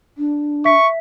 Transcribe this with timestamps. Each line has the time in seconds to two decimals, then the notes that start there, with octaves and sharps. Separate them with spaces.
0.18 D4
0.65 E5 C#6 B6